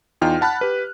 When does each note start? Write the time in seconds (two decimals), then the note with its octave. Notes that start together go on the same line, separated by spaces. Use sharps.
0.21 E2 D#4 F4 G5 F6
0.41 F#5 A5 B5 F6 F#6
0.61 G4 B4